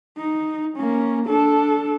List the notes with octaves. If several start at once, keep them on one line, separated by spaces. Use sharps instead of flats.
D#4
A#3 C#4
D4 A4